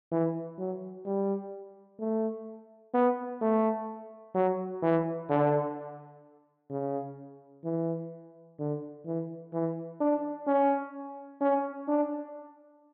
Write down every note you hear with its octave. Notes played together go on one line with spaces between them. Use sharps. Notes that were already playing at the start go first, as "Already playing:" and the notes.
E3
F#3
G3
A3
B3
A3
F#3
E3
D3
C#3
E3
D3
E3
E3
D4
C#4
C#4
D4